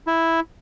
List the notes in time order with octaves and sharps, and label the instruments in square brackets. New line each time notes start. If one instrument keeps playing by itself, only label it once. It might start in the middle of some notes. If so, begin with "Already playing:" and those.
[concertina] E4